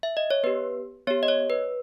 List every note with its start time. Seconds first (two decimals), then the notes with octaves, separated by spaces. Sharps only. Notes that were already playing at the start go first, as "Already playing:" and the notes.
0.03 E5
0.17 D#5
0.31 C#5
0.43 B3 G4 B4
1.07 B3 G4 C#5
1.23 D#5
1.28 C#5
1.50 B4